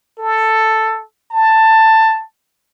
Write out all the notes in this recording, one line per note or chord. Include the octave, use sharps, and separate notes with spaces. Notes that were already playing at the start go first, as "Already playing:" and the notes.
A4
A5